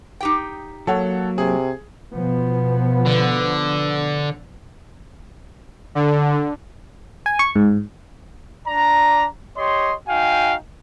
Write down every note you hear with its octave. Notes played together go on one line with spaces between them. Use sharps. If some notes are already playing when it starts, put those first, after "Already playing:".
D#4 G4 G5
F#3 A#3 A4 C#5 F#5
C3 G#4
B2 F3 B3
D3
D3
G#5
C#6
G#2
D4 D5 A#5
G4 C#5 D#5 C6
D#4 F#4 F5 G5 G#5